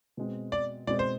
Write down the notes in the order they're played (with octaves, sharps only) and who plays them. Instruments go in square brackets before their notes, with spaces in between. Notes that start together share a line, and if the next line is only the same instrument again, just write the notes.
[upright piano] B2 G#3 C4
[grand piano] D5
[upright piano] B2 G#3 C4 [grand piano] D5
[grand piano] C5